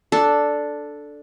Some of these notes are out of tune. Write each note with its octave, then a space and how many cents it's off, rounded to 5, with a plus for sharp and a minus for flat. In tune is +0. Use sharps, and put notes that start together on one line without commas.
D4 +0 A4 +0